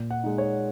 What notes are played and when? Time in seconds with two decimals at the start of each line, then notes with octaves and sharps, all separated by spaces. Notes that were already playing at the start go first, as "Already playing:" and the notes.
Already playing: A#2
0.11 F#5
0.23 G#3 D#4
0.38 C#5